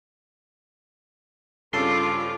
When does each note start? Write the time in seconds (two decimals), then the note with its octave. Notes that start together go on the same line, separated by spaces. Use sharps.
1.73 G2 C#3 C4 C#4 F4 A4 C6 D6